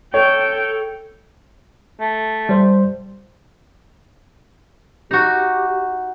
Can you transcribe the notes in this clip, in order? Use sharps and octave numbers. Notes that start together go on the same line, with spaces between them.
A4 C#5 G5
A3
G3 C5
D#4 F#4 G4